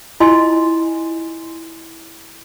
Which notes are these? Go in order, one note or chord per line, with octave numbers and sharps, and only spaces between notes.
E4 F4 D#5 G#5 C6